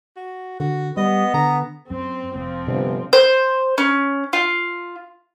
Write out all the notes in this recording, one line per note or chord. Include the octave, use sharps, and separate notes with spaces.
F#4
D3 F#4
G3 B3 D#5
D3 A#5
F#2 C4
F1 F3 C4
G1 C3
C5
C#4
F4